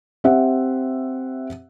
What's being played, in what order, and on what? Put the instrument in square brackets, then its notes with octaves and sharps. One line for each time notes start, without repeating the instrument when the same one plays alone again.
[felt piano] C4 G4 E5 F#5